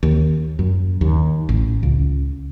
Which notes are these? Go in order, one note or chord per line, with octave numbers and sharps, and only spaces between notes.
D#2
F#2
D#2
A1
C#2